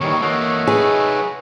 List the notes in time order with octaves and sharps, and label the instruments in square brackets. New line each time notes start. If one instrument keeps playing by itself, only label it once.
[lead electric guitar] D#2 [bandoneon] D#3 E3 G3 [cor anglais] C#5
[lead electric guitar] E3 A#3 [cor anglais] A3 [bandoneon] C#5 D#5 F#5
[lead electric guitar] D#4 B4 [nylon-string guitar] G#4